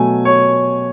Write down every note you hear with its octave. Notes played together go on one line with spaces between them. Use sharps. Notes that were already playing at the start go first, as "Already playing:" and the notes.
Already playing: B2 F#3 A3 G#5
C#5